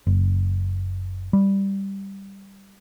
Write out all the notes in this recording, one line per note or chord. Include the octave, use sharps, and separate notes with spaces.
F#1
G3